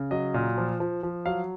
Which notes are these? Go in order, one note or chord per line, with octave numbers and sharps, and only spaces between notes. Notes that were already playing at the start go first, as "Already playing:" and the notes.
Already playing: C#3
F#3 D#5
A#2
F3
F3
F3
F#3 F5